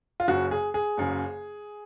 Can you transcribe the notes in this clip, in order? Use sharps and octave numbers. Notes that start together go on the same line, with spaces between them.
F4
F#1 F#2 C#3 F#4
G#4
G#4
F#1 F#2 C#3